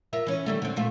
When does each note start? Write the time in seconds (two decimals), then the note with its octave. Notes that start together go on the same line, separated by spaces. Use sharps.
0.13 F4 A#4 E5
0.26 E3 C#4
0.46 D#3 G3 A3
0.62 D3 C4
0.76 A#2 A3 F4